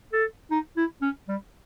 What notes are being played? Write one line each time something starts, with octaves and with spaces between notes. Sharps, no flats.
A4
D#4
E4
C#4
G3